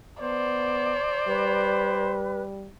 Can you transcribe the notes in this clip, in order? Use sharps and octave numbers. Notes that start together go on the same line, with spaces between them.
B3 C5 D5
G3 B4